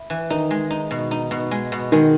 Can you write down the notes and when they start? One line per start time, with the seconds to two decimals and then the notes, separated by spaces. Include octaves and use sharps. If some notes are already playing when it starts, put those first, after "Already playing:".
Already playing: E4
0.10 E3
0.30 D#3 D#4
0.51 G#3
0.71 D#4
0.91 B2
1.11 D#4
1.31 B2
1.51 G#3
1.72 B2
1.92 D#3 G#3